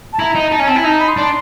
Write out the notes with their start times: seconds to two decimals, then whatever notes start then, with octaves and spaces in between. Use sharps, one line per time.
0.13 A5
0.19 E4 A#5
0.35 D#4
0.52 D#4 A5
0.59 C#4 G#5
0.67 C4 A5
0.76 E4 G#5
0.84 D#4 A5
0.93 A#5
1.00 B5
1.09 C6
1.17 D4